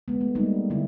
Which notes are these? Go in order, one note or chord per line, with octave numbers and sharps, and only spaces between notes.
G#3 B3
A3
G3 G#3 A#3 D#4
D3 E4